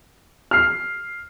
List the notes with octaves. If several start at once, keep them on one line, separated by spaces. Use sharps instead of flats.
F6 C7